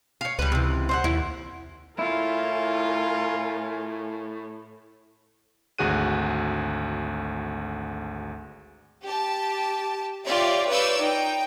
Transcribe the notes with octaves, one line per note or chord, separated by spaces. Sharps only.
C#5 F5
C#2 G3 B4
C3 E3
C5 E5 F#5
D#2 E4
A2 E4 F4 A#4 G#5
G#1 D2 F#4 G#4 F#6 D#7
G4 A5
F4 G4 C#5 D5 E5
B4 C#5 D5 F5 E6 G6
D#4 G5